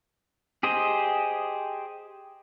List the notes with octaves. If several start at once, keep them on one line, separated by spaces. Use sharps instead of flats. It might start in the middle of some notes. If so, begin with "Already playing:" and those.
G4 G#4 C5 D#5